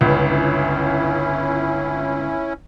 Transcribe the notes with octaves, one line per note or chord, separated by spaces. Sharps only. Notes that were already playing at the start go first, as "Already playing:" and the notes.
G1 C#2 C#4 E4